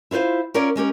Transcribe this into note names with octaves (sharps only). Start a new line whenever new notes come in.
E4 F4 B4 C5 F5
C#4 F4 A#4 C#5 D5
G#3 C#4 G4 A#4